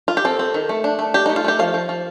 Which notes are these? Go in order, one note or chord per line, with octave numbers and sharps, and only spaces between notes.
F4
G4
C4 A4
C4
D#3
A3
D4
A3
D4 G4
A3 D#4
F4
A3 G4
F3 F5
F3
F3